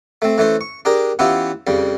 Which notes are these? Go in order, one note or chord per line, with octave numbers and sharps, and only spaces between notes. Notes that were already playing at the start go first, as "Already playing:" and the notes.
A3 C4
E3 A3 C#4 C5
C#6
D4 G4 G#4 A#4
E3 B3 C#4 E4 F4 G4
F2 C#3 G3